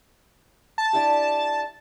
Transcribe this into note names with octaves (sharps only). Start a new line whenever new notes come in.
A5
D4 E4 G4